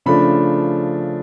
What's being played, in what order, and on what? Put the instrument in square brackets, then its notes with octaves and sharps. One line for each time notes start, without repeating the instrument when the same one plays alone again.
[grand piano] C#3 F3 A3 D4 B5